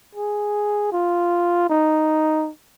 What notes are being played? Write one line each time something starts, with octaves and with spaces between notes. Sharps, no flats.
G#4
F4
D#4